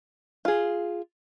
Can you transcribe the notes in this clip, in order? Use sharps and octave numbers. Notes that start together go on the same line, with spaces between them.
F4 G#4